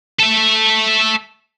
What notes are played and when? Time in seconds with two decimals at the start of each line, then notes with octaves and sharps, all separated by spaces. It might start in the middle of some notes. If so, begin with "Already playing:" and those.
0.19 A4 E5